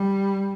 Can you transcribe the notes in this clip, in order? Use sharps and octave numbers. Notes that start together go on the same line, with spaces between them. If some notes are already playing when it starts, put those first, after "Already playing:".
Already playing: G3